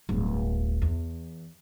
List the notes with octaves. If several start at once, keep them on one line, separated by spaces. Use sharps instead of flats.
D1 G1
E2